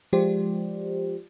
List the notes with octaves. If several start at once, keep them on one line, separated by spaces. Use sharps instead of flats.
F3 G#3 F4 G4 C5 D5